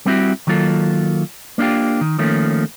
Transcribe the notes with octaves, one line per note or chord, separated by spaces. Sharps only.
G3 B3 C4 E4 F#4 G4
D#3 F#3 A#3 F4 A4
A#3 D4 E4 F4 G4
D#3
D#3 F3 A3 A#3 C#4